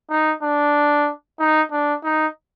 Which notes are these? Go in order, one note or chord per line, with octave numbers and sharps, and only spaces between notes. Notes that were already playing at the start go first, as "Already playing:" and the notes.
D#4
D4
D#4
D4
D#4